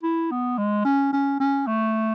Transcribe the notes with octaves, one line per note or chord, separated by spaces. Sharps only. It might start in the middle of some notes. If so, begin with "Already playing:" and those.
E4
B3
G#3
C#4
C#4
C#4
A3